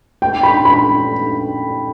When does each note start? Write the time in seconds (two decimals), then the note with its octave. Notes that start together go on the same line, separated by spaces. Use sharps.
0.22 G5
0.43 B5
0.65 B5